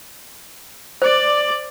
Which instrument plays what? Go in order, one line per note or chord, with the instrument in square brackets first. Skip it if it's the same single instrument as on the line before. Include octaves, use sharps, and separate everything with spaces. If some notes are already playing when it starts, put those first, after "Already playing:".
[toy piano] C5 [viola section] D5